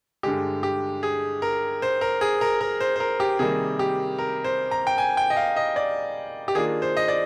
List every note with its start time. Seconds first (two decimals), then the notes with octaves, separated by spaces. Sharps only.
0.23 G2 D3 G#3 G4
0.63 G4
1.03 G#4
1.42 A#4
1.82 C5
2.01 A#4
2.21 G#4
2.41 A#4
2.61 A#4
2.80 C5
2.96 C5
3.00 A#4
3.20 G4
3.39 C3 D#3 G3 A#3 G#4
3.79 G4
4.18 A#4
4.44 C5
4.71 A#5
4.87 G5
4.98 G#5
5.17 G5
5.30 D#5
5.37 F5
5.57 D#5
5.76 D5
6.48 G4
6.55 D#3 A#3 D4 F4 G#4
6.82 C5
6.97 D#5
7.08 D5